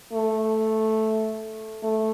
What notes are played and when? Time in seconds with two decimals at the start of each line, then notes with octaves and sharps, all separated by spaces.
0.13 A3
1.83 A3